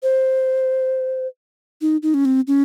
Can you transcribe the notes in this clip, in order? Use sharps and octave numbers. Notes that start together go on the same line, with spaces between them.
C5
D#4
D#4
C#4
C4
C#4